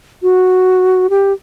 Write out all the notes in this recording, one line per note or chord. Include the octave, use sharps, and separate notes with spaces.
F#4
G4